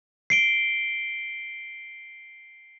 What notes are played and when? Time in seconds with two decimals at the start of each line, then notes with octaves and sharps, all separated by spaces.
0.30 C7 D7 G7